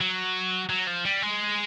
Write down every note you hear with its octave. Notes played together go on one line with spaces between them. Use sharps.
F#3
F#3
F3
G3
G#3